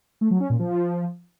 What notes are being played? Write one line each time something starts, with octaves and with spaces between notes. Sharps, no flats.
A3
F#3
C#4
A#2
F3